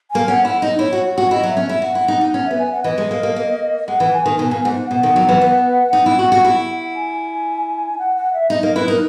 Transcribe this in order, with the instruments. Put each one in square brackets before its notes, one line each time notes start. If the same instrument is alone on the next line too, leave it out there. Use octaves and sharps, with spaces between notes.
[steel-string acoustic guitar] A#3 [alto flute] G#5
[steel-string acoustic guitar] C#4 [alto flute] F#5
[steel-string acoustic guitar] E4 [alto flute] F#5
[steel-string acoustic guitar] D#4 [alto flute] D#5
[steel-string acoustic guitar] E4 [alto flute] C#5
[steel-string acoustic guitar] F#4
[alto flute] C#5
[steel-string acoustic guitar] F#4
[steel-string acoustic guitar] E4 [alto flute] D#5
[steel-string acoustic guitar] F#3
[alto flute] E5
[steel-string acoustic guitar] C#4
[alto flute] E5
[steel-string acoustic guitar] E4
[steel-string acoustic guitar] F#4 [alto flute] F#5
[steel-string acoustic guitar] E4
D#4
D#4
[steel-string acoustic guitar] C#4 [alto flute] F#5
[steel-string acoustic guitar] B3 [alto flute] E5
[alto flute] G#5
F#5
[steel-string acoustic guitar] E3 [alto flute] D#5
[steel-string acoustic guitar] G#3
A#3
A#3
A#3
[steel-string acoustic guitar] G#3 [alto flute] F#5
[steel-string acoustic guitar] E3
[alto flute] G#5
[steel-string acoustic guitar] D#3
[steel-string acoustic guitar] B2 [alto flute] G#5
[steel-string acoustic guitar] A#2
[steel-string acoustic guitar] G#2 [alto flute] F#5
[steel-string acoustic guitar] B2 [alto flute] F#5
[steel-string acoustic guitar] D#3
F#3
E3
B3
D#4
E4
F#4
F#4
E4
[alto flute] G#5
F#5
F#5
E5
[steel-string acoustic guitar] D#4 [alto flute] D#5
[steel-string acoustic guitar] A#3 [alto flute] D#5
[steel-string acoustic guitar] E4 [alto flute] B4
[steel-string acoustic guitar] D#4 [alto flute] A#4